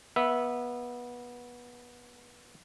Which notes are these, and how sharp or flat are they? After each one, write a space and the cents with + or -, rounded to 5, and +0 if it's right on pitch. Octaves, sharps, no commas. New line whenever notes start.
B3 -20 E5 -5